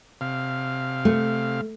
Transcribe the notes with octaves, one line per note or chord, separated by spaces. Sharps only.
C3 F5
A3